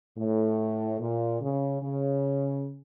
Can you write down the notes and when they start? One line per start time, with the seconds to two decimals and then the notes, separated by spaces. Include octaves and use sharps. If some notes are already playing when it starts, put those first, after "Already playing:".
0.18 A2
1.00 A#2
1.41 C#3
1.82 C#3